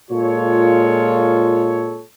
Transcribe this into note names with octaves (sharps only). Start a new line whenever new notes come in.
A#2 G#3 F4 A4 C#5